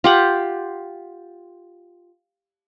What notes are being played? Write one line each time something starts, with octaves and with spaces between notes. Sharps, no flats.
F4 G4 F#5